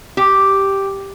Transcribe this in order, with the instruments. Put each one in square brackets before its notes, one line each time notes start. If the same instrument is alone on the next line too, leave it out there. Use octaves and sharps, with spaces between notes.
[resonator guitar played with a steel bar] G4